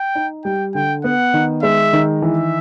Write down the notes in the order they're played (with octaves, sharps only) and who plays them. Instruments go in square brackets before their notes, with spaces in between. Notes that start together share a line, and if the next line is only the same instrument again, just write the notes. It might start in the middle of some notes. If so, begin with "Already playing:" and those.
Already playing: [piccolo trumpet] G5
[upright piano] D#4
[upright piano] G3 [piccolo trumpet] G5
[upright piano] D3 [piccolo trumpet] G5
[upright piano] B3 [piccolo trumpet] F#5
[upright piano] D#3
[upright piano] G#3 [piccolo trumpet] E5
[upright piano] D#3
[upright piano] E3 [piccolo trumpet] E5